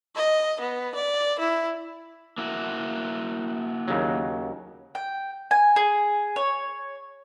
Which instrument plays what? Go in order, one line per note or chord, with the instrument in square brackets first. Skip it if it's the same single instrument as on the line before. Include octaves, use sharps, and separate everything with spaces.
[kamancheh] D#5
B3
D5
E4
[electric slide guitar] A#3 E4 F#4
[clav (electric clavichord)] D#2 C#3 F#3
[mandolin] G5
G#5
G#4
C#5